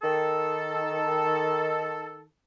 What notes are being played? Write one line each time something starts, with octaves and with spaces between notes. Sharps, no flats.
D#3 A4